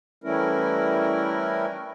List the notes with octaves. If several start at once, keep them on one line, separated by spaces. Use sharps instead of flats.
E3 G3 A3 C#4 E4 A#4